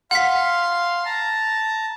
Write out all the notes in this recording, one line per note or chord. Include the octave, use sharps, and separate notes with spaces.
F5 F#5 C6 B6
A5 A#5